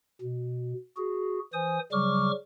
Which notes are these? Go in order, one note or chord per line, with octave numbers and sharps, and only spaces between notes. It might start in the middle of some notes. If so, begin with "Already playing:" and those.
B2
F#4 G#4
E3 C5 G#5 D#6
C#3 F#3 G3 C#6 D6 F6